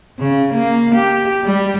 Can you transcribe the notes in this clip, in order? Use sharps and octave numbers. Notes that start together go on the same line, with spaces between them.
C#3
A#3
G4
G3